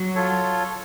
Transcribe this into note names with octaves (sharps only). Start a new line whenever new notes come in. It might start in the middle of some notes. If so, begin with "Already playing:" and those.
Already playing: F#3
F4 A4 C#5